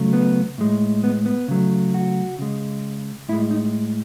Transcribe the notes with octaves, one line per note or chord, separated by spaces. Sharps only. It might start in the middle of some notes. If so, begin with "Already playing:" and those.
Already playing: C#3 F#3 A3
B3
A2 G#3
B3
B3
C#3 F#3 A3
F#4
C#3 G#3
A2 G#3 E4
D#4